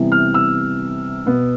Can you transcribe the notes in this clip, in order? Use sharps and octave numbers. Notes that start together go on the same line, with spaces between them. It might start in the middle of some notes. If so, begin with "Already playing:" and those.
Already playing: C3 E3 G3 B3
F6
E6
B2 B3